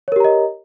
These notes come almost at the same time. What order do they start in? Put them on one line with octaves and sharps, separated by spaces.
C#5 A#4 G4 A#5 D#5